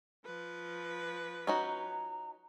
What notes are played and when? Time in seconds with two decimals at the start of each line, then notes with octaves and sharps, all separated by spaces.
0.25 F3 B4
1.47 C#4 D#4 F#4 A#5